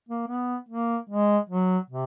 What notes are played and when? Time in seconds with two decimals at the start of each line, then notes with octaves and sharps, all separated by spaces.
0.09 A#3
0.28 B3
0.69 A#3
1.09 G#3
1.49 F#3
1.90 C3